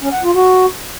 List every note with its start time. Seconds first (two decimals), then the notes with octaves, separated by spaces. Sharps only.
0.01 C#4
0.12 F#5
0.24 F4
0.35 F#4